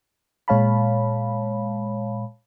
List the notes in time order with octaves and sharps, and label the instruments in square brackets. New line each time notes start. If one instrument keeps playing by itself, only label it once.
[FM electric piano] A#2 G#3 C#5 F5 A5 B5